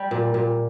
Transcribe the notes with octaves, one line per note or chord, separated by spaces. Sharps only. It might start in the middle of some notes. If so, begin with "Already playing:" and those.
Already playing: G3
A#2
A#2